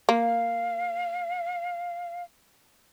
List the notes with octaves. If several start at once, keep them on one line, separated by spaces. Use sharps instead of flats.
A#3 F5